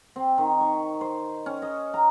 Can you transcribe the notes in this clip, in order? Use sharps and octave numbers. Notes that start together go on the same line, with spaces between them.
C4
D#3
C#6
C5
C#4
D#5
A#5